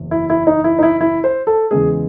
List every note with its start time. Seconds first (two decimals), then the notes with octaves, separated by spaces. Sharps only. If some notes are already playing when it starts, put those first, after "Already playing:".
Already playing: F#1 E2
0.11 E4
0.30 E4
0.47 D#4
0.64 E4
0.79 D#4
0.83 E4
1.01 E4
1.24 C5
1.47 A4
1.71 E2 C#3 G#3 G#4